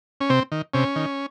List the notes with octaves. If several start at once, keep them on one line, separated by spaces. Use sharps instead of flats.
C#4
C3 C4
D#3
C3 C#4
D#3